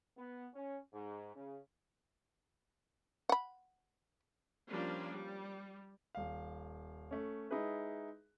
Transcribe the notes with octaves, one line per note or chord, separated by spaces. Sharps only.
B3
C#4
G#2
C#3
F#5 B5
F3 G3 A#3 C#4 D4
G3
D#1 F5
A3 C#4
G#3 D#4 E4 G#4 B4